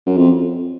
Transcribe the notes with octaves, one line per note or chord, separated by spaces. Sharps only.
F#2
F2